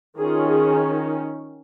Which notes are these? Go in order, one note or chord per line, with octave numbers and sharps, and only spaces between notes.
D#3 C#4 F4 G#4
G#4